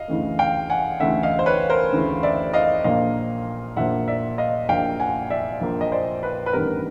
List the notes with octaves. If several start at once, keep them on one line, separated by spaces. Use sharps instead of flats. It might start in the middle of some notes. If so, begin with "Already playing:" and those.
Already playing: D#5 F5
D2 C#3 E3 A3
F5 G5
F#5 G#5
D2 C#3 E3 A3 E5 F#5
D#5 F5
C5
B4 C#5
A#4 C5
D2 C#3 E3 A3
D5 E5
D#5 F5
A#1 A#2 F3 A#3 D#5 F5
A#1 A#2 F3 A#3 E5 F#5
D5 E5
D#5 F5
A#1 A#2 F3 A#3 F5 G5
F#5 G#5
D5 E5
A#1 A#2 F3 A#3
D#5
C5 D5
B4
B4
A1 G2 D#3 G3 B3 A#4